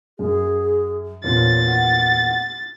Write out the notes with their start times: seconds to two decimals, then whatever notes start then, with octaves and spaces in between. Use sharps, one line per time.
0.19 F#2 G#4
1.24 E2 A#2 C4 C#5 A6
1.67 F#5